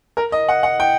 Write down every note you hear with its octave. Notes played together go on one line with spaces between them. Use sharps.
A#4
D#5
F#5
F#5
G5